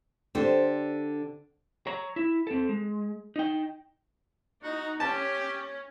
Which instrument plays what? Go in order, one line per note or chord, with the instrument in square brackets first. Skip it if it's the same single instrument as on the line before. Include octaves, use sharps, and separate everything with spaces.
[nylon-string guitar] D3 G4 [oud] C5
[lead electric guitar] C#5 A#5
E4
C4 A4
G#3
D#4 G5
[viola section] D#4 [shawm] F#4
[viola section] C#4 [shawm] G4 [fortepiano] A5